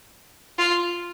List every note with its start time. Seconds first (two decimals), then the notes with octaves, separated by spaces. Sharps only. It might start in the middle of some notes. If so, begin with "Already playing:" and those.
0.58 F4